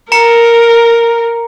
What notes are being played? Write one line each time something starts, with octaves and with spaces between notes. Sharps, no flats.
A#4 A#5 C#7